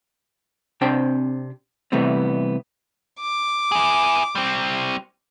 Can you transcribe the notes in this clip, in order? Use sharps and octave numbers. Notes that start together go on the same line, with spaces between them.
C3 C4 D4 C5 G5 A5
C3 E3 G3 A3 B3 C4
D6
E4 G#4
G3 C4